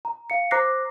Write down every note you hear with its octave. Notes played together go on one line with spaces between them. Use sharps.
A#5
F5 C#7
C5 A#5 D6 F#6 A#6 C7